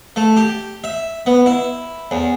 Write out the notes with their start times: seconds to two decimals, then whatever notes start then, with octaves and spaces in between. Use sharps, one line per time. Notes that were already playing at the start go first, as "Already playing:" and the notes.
0.16 A3
0.37 G4
0.84 E5
1.26 B3
1.46 E4
2.11 E2